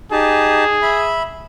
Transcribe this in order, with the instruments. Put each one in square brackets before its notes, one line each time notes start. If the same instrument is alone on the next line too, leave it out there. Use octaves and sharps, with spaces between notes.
[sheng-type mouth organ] D#4 G4 A5 [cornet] G#4
[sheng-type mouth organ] E5 B5